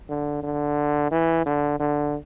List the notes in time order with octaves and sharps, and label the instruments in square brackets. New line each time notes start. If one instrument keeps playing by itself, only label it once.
[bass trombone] D3
D3
E3
D3
D3